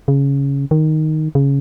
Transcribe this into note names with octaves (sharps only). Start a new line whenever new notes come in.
C#3
D#3
C#3